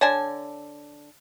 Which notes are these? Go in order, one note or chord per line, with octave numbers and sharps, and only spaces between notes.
D3 C#5 D5 G#5 A5